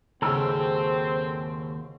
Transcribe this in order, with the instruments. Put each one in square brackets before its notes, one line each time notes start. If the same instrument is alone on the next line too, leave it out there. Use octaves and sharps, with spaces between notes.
[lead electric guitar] D#2 [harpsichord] G#2 C#3 F#3 [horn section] C4 [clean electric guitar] A4